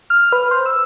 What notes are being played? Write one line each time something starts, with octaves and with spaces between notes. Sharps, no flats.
F6
B4
C5
E6